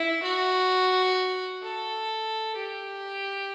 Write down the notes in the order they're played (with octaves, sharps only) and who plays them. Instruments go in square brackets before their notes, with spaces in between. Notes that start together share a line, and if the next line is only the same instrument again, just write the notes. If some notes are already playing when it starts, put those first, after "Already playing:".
Already playing: [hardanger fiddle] E4
F#4
A4
G4